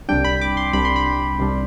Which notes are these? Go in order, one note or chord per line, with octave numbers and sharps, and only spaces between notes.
C2 C3 G3 D4 G5
B5
D6
C6
C2 C3 G3 D4 B5
C6
B5
C2 C3 G3 D4